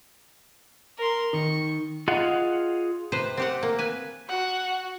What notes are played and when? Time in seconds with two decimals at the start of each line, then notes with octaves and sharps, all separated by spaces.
0.97 A#4 C6
1.33 D#3 C#6
2.08 F4 G#4 D#5 F5 F#5
3.12 C3 B4 C5
3.37 C4 G4 F#5
3.63 A#3
3.79 B4 G#5
4.29 F#4 F#5